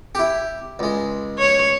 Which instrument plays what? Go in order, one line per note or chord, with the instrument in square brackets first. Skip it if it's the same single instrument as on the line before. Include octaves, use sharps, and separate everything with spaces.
[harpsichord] E4 G4
C#2 G#3
[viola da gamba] C#5